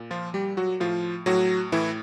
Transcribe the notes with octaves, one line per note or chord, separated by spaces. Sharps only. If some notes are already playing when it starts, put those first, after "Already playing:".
Already playing: A#2
F3 F4
G3 G4
F#3 F#4
A2 F3 F4
A2 F#3 F#4
A2 E3 E4